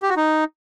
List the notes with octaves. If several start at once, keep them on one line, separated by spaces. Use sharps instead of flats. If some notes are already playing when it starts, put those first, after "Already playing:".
G4
F#4
D#4